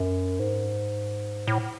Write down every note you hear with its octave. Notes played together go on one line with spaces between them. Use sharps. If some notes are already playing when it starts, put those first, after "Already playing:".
Already playing: F#2
G#2
A2